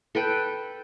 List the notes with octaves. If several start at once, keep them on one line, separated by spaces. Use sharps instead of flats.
A4 B4 G5